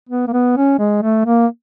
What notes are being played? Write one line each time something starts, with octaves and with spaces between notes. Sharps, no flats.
B3
A#3
B3
C#4
G#3
A3
A#3